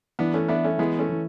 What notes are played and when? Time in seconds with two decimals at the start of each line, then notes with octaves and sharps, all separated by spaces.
0.19 E3 B3 D4
0.34 A3 C#4
0.48 B3 D4 E4
0.64 A3 C#4
0.78 E3 G#3 B3
0.99 A3 C#4
1.09 E3